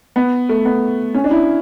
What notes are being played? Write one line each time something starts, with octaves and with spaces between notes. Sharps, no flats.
B3
A3
B3
C#4
D4
E4